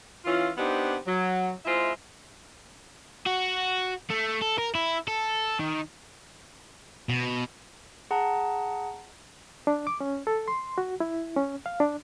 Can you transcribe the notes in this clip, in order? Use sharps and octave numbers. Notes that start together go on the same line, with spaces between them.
E3 C#4 F4
B3 C4 D4 D#4 G4
F#3
G#3 C4 E4 F4 E5
F#4
A3
A4
A#4
E4
A4
D#3
B2
G#4 F#5 A5 A#5
D4
D6
C#4
A4
C6
F#4
E4
C#4
F5
D4